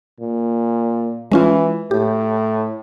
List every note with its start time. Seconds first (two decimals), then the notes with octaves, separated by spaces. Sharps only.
0.20 A#2
1.32 E3 G#3 C#4 F4
1.91 A2 G4